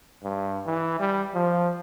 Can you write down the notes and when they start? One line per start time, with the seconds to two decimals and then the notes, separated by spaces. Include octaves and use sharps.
0.24 G2
0.66 E3
0.99 G3
1.34 F3